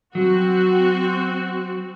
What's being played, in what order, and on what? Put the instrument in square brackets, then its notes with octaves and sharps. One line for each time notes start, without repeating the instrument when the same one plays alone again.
[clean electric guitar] F#3 [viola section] C4 F#4